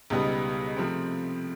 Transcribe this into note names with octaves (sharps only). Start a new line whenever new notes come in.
C#2 B2 G3 B3 D#4
C3 F3 A3 C4